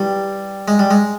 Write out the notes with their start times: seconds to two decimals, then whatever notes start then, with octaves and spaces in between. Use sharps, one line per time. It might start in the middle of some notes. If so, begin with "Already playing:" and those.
Already playing: G3 E4 G4 B4 G5
0.68 G#3
0.79 G3
0.91 G#3